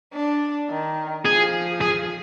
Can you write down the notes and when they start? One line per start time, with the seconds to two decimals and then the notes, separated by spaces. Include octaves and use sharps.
0.13 D4
0.70 D#3
1.25 F3 G#4
1.81 G#4